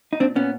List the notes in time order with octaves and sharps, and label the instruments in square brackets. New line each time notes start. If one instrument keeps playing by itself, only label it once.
[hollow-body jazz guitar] D#4
A#2 C4 D4
A#2 B3 C#4